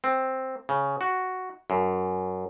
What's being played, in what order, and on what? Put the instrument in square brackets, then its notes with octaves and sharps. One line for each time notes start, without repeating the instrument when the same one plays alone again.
[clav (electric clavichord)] C4
C#3
F#4
F#2